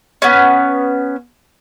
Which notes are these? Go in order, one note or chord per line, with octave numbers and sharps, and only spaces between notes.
B3 C#4